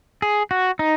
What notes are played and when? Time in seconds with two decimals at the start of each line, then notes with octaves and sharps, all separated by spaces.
0.22 G#4
0.51 F#4
0.79 D#4